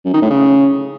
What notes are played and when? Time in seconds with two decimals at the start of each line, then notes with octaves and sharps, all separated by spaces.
0.05 F#2
0.13 D#3
0.22 A2
0.30 C#3